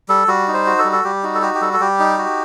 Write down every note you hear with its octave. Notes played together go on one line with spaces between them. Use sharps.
G3 A4
G3 F#4
D#4
C5
F#4
A4
G3
A4
G3 G4
D#4 F#4
A4
F#4 G4
G4
G3 A4
A4
G3 G4
D#4
F#4